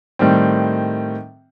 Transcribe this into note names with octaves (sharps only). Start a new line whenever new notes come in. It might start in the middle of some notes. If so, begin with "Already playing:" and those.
A2 D#3 G3 C4